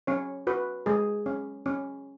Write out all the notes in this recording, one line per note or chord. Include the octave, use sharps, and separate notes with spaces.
C#4 C#5
F#4 B4
G#3 G#4
C#4
C#4